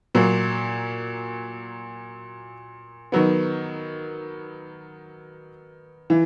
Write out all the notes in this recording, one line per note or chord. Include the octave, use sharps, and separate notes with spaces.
A#2 F#3 A#3
D#3 F#3 B3
E3